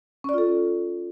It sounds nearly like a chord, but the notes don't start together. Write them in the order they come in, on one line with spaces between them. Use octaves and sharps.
C#4 D5 F4 A4